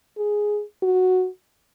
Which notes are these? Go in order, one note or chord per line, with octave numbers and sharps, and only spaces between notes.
G#4
F#4